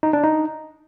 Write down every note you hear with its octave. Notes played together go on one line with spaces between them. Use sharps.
D#4
D4
D#4